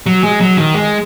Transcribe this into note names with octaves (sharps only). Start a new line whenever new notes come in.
F#3
G#3
F#3
D#3
G#3